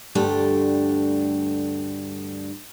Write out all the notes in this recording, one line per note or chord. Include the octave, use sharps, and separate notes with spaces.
D2 G2 A3 D4 G4